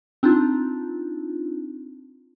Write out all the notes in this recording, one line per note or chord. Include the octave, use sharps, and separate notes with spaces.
C4 D4 D#4 F4